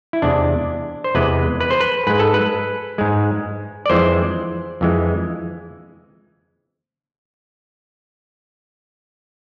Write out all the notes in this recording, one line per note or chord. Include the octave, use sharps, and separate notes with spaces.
E4
E2 C3 G#3 D4
C5
E2 C3 G#3 B4
B4
C5
B4
G#2 G#3 B4
A4
B4
G#2 G#3
D5
F2 E3 G#3 C5
F2 E3 G#3